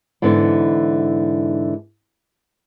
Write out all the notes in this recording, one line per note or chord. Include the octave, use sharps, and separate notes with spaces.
G#2 D3 E3 B3 E4